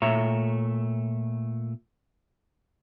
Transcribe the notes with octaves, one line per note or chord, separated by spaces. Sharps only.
A#2 A3 C#5 E5 A#5